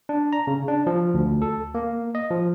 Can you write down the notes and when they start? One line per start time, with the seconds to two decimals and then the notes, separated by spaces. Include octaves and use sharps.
0.09 D4
0.33 A#5
0.47 C#3
0.68 D4
0.87 F3
1.14 D2
1.42 A4
1.75 A#3
2.15 D#5
2.31 F3